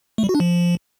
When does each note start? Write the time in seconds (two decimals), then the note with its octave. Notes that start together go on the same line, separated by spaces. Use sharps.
0.18 A3
0.24 G3
0.29 F#4
0.35 D4
0.40 F3